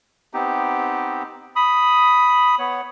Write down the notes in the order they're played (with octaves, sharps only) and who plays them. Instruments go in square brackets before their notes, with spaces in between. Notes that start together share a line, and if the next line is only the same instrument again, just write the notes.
[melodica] B3 C4 D#4 G4
B5 D#6
B3 C#5